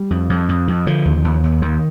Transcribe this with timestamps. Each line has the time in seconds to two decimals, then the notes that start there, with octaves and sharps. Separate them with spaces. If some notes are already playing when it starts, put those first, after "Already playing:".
Already playing: G3
0.10 F2
0.29 F2
0.49 F2
0.68 F2
0.86 D3 F3
1.05 D#2
1.24 D#2
1.43 D#2
1.62 D#2 D#3